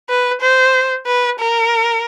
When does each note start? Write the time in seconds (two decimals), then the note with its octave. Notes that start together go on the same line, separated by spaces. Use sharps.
0.09 B4
0.42 C5
1.07 B4
1.40 A#4